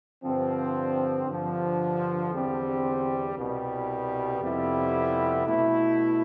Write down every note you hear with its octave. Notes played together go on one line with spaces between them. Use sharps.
G2 D3 F3 C4
G2 D3 F3
E2 D3 G3 C4
C2 B2 G3
F2 C3 G3 B3 E4
B2 A3 E4